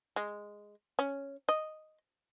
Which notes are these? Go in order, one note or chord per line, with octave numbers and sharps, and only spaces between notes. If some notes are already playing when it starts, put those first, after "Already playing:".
G#3
C#4
D#5